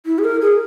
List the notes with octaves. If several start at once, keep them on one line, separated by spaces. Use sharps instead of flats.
E4
G#4
A#4
G#4